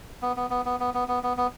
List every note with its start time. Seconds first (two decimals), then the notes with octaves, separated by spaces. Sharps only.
0.22 B3
0.36 B3
0.50 B3
0.65 B3
0.80 B3
0.94 B3
1.08 B3
1.23 B3
1.37 B3